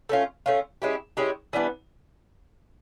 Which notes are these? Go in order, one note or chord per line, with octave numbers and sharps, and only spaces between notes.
A3 C#4 F4
A3 C#4 F4
G#3 C#4 E4 G4
G#3 C#4 E4 G4
E3 G3 B3 D4